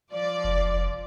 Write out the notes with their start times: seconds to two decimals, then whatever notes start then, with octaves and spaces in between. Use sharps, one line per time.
0.11 F3 D5
0.44 F1